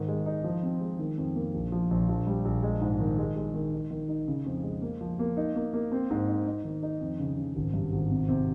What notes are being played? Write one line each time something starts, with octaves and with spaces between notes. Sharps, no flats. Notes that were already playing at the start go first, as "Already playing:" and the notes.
Already playing: G#2 D#3
G#3
D#4
F3
C4
G#3
D#3
F2
A#3
A#1
F3
A#1
A#1
G3
A#1
G#3
G#2
D#3
G#3
G#3
D#3
D#4
D#3
D#4
C#3
F2
G#3
A#3
F3
A#3
D#4
A#3
A#3
C4
G#2
D#4
D#4
D#3
D#4
F2
C#3
C#3
G#1
G2
G#1
C3
C3